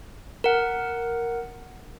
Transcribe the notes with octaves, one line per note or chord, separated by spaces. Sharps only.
A#4 F#5